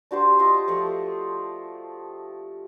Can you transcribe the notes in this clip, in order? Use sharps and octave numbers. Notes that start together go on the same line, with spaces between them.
D4 F#4 G4 C5
F4 D#5 C6
F3 A3